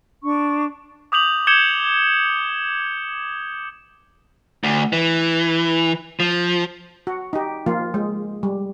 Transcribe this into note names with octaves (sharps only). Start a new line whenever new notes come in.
D4 C#6
D6 D#6 G6 F7 F#7
D6 G6 G#6 C#7 E7 G7
D2
E3
F3
F#4
D#4 G4
F3 A#3 F4
G#3
G3